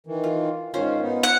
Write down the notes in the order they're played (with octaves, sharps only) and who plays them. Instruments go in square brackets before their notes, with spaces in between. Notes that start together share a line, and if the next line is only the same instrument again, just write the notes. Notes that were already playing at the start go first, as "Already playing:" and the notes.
[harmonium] D#3 E3
[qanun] F4
[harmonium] G#2 D#3 [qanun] C#4 F4 C5
[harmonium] B3 D#4
[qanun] E5 [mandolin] F#5